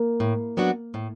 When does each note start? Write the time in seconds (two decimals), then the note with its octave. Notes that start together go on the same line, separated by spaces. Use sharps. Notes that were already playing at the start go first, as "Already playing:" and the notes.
Already playing: A#3
0.20 A2
0.57 F#3 B3 D4 F#4
0.94 A2